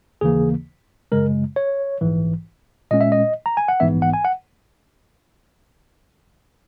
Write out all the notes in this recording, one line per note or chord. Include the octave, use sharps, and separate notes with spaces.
D#2 C#3 E3 A#3 G#4
F#2 C#3 G#3 A#4
C#5
A#1 G#2 E3
A#2 G#3 C#4 D#5
E5
D#5
A#5
G#5
F#5
A#1 G#2 E3 B3 E5
F#5
G#5
F#5